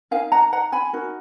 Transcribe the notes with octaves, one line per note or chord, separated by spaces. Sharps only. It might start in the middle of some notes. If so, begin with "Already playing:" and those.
D#4 A#4 F5 G#5
F#5 A#5
F#5 A#5
G#5 B5
D#4 F#4 A#4